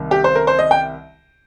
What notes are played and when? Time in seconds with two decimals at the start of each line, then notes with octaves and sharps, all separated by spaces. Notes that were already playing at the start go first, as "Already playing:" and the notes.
Already playing: C2 C3 D#3
0.11 G4
0.24 C5
0.35 A#4
0.47 C5
0.59 D#5
0.71 G5